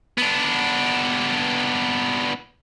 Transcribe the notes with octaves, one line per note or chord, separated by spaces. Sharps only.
B3 D4